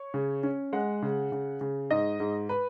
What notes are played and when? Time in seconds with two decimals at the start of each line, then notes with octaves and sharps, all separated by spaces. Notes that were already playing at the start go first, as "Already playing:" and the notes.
Already playing: C#5
0.14 C#3
0.43 C#4
0.73 G#3 F#5
1.02 C#3
1.32 C#3
1.61 C#3
1.91 G#2 D#5
2.20 G#2
2.49 B4